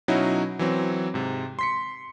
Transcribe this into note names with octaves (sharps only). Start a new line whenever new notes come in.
B2 F#3 C#4 D#4 E4 F#4
E3 F#3 C4
G#2 C3
C6 B6 C#7